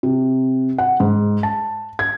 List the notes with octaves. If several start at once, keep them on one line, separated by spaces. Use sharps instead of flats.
C3
F#5
G#2
A5
G#6